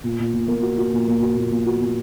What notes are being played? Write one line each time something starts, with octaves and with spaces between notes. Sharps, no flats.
A#2
A#2
A#2
A#3
F#4
F#4
A#2
A#3
F#4
A#2
A#2
F#4
A#2